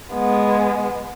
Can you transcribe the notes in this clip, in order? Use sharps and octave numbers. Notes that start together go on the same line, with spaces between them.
G#3 B3